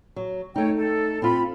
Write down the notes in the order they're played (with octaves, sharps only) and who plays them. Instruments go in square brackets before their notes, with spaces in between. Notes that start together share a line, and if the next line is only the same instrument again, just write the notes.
[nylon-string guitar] F#3
[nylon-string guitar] A3 D#4 [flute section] C#5 G5
[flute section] A4
[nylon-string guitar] C4 F4 [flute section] B5